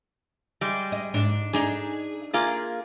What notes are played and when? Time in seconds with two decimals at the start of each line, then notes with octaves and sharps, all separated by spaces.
0.61 G3 G#3
0.92 D#5
1.14 G#2 D4
1.53 D4 D#4 G#4
2.33 A#3 F4 G#4